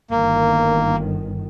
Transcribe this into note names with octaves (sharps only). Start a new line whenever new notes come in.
G1 D#3 A#3